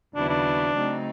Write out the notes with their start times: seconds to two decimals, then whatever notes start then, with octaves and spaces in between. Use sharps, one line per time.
0.15 D#2 C#3 F#3 B3 D4 E4
0.30 D4
0.74 C#3 F#3 A3 C4 D#4